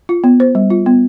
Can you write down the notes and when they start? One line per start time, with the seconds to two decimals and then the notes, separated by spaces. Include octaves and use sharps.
0.09 F4
0.24 B3
0.40 C5
0.55 G3
0.70 F4
0.86 B3